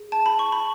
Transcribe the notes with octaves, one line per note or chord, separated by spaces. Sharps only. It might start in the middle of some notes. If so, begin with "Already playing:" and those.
Already playing: G#4
A5
B5
C#6
B5